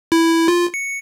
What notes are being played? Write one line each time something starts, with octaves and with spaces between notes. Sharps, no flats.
E4
F4
C#7